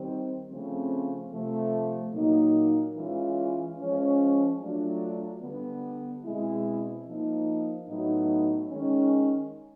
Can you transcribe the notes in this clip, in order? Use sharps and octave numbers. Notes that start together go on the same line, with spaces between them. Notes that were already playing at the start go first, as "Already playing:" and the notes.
Already playing: D#3 G3 C4
C#3 F3 A3 C4
C3 F3 A3
A#2 F#3 A#3 D#4
E3 G#3 C#4 F4
F3 G#3 C#4
F#3 A3 D4 F4
D3 G3 B3
B2 G#3 C4 E4
F3 A#3 D#4
A2 F#3 B3 D#4
D#3 G#3 C#4